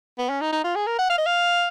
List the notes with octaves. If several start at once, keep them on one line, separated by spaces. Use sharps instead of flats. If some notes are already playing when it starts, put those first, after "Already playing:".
B3
C#4
D#4
D#4
F4
G#4
A#4
F#5
F5
D#5
F5